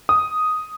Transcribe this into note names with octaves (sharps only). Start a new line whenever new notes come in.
D#6